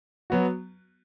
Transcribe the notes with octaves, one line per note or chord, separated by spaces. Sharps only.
F#3 B3 F#4